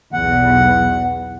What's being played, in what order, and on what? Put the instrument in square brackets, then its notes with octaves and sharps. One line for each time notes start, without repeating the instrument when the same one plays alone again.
[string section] B1 E2 [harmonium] F#5